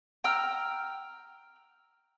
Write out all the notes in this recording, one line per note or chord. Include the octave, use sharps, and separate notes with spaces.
G5 A#5 E6 F6